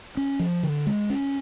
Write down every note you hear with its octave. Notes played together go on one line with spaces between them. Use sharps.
C#4
F3
D3
G#3
C#4